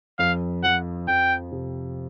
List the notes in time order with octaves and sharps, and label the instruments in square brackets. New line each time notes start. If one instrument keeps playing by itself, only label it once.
[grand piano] F2 [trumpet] F5
[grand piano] F3 [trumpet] F#5
[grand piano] F2 [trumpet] G5
[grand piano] C3